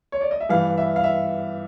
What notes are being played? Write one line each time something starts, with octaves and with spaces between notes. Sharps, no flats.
C#5
D5
D#5
E5
G2 E3 F5
E5
F5
E5